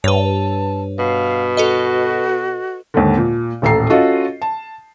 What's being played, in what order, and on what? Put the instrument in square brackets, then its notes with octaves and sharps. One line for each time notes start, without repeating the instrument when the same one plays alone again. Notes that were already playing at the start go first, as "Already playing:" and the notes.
[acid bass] G2 [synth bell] B4 C#5 [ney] A5
[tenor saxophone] B2 [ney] F5
[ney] F#4 [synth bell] A4 B4 D#5
[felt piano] D#2 G#2 D3
A#2
D#1 A1 A4 A#5 C7
C#4 F4 F#4 A4 D#5
A5